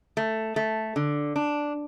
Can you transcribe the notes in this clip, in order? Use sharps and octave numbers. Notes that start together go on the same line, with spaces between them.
A3
A3
D3
D4